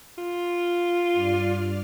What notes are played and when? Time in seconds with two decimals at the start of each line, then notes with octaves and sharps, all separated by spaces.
0.18 F4
1.13 G2 D5 F6